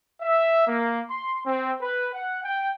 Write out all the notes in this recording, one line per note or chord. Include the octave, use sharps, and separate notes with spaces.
E5
A#3
C6
C4
B4
F#5
G5